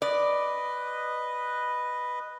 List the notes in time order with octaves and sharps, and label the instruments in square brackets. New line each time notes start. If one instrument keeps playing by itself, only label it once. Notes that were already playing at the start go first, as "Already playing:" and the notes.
[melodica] B4 D#5 [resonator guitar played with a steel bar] D5